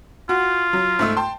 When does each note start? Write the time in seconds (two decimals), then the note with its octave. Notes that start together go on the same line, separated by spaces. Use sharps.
0.29 F4 F#4
0.73 F#3
0.99 G#2 A3 E6
1.17 G5 A5 C6